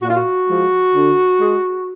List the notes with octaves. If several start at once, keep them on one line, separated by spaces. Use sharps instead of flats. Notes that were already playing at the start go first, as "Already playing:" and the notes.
A#2 F#4
F4
F#4
F3 G#3
D3
G#3